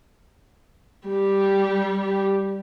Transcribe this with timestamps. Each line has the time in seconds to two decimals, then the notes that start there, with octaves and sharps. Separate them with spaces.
1.08 G3 G4